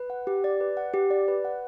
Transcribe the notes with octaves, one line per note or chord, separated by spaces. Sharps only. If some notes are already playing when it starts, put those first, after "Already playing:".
Already playing: B4
F#5
G4
D5
B4
F#5
G4
D5
B4
F#5